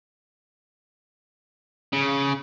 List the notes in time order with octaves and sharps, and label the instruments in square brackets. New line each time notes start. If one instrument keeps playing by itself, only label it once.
[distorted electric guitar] C#3